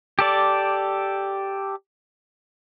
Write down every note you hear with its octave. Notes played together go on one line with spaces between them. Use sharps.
G4 A4 D5